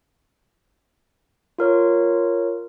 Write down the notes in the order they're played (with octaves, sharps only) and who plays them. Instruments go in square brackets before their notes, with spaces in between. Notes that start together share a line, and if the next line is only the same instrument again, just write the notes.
[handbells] F4 A#4 C#5